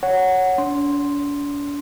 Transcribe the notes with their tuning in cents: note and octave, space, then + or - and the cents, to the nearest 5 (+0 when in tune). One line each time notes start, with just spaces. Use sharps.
C#5 +0 F#5 +0
D4 -40 C6 +0